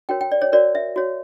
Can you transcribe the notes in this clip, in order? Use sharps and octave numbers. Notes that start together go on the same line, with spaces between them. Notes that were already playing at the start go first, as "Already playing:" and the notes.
F#4 A#4 C#5 G5
G5
D5
C#5
F#4 A#4 C#5 D5
E5
F#4 C#5